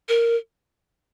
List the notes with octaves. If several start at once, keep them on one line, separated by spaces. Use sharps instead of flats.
A#4